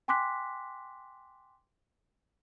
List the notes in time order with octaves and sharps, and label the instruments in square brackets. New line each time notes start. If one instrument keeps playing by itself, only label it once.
[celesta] G5 G#5 C6 D6 F#6 B6